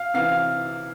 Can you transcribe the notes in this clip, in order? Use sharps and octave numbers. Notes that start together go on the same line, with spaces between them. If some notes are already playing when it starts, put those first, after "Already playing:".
Already playing: F5
C3 E3 F5